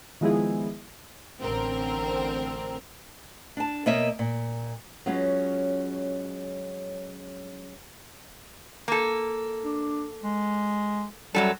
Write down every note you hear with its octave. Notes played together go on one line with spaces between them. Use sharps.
D#3 F3 G#3 B3 E4 G#4
A1 D3 C4 A#4
D4 A5
B2 A#3 A#4 C#5 D#5 E5
A#2
F#3 G#3 B3 C#4 F4
A#3 A4
D4
G#3
F#2 F#3 G3 A4